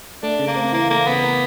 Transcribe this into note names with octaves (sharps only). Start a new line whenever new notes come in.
A3 D4
C#3
A#3
C4
E3 A#3
A3 A#3
C#3 B3
A#3